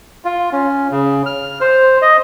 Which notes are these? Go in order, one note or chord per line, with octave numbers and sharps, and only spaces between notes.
F4
C#4
C#3
F6
C5
D#5